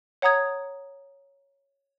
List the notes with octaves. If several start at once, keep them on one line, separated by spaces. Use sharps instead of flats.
C#5 F#5 A#5 D#6 G#6